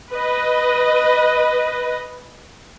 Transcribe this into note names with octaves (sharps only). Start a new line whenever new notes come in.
B4 D#5